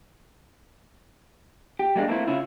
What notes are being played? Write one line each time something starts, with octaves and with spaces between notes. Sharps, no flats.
G4
G3 G#3 A#3 D4 G4
A3 A#3 C4 E4 C5
C#3 C#4 E4 F4